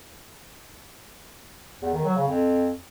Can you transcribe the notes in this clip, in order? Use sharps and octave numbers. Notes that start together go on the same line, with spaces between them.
E2
D#3
F#3
C#3
F2